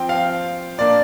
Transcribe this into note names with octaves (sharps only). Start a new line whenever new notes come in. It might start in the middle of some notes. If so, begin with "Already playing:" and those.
Already playing: F3 C4 G5
F5
A#2 A#3 D4 D5